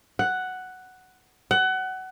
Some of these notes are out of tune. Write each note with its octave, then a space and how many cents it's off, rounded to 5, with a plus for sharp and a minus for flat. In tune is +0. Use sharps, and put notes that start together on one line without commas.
F#5 +5
F#5 +25